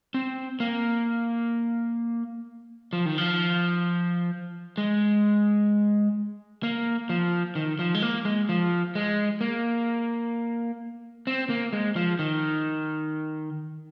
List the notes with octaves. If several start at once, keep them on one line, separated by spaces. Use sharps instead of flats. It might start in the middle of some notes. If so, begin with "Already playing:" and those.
C4
A#3
F3
D#3
F3
G#3
A#3
F3
D#3
F3
G#3
A#3
G#3
F3
G#3
A#3
C4
A#3
G#3
F3
D#3